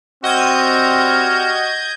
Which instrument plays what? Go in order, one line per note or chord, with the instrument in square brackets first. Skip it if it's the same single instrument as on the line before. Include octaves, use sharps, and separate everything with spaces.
[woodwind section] G3 F6 [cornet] C4 [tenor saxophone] F#4 [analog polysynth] D#5 G6 G#6